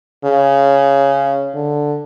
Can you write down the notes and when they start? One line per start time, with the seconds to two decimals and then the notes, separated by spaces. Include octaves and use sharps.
0.25 C#3
1.54 D3